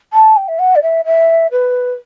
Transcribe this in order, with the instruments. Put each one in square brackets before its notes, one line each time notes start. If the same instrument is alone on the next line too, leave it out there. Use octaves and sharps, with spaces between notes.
[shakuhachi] A5
G5
E5
F#5
D5
E5
E5
B4